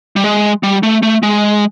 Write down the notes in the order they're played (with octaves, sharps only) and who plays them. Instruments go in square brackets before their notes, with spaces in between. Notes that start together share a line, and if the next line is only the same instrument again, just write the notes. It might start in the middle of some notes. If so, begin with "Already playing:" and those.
[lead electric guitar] G3
G#3
G3
A3
A3
G#3